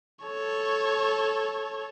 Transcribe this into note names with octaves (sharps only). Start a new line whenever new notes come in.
A4 C#5